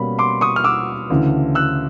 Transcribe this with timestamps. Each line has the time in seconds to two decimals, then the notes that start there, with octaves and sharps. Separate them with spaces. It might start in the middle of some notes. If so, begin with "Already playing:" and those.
Already playing: B2 G3 A#3 C#4 B5
0.19 C6 D6
0.41 C#6 D#6
0.56 F6
0.64 D6 E6
1.10 D2 C#3 E3
1.55 E6 F#6